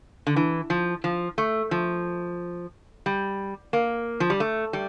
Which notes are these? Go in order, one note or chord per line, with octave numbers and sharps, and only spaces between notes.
D3
E3
F3
F3
A3
F3
G3
A#3
F3
G3
A3
G3